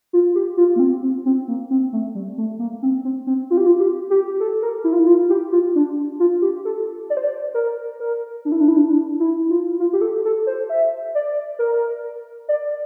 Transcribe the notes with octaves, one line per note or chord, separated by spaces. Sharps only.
F4
G4
F4
A#3
C4
C4
C4
A#3
C4
A3
G3
A3
A#3
C4
C4
C4
F4
G4
F4
G4
G4
A4
A#4
E4
F4
E4
F4
G4
F4
D4
F4
G4
A4
D5
C5
D5
A#4
A#4
D4
E4
D4
E4
D4
D4
E4
F4
F4
G4
A4
A4
C5
E5
D5
A#4
D5